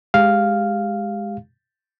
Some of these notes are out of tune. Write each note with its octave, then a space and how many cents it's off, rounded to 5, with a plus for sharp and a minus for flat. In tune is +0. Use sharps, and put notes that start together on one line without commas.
G#3 +0 G4 +10 F5 +0